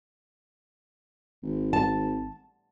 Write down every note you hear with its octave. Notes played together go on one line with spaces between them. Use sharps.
G#1
A5